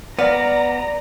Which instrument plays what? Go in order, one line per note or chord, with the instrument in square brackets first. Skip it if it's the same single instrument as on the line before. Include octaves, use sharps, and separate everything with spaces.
[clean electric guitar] B3 [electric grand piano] D5 [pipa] F5 [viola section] A#5